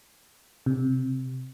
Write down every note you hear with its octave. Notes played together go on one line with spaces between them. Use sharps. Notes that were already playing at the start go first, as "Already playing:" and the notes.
C3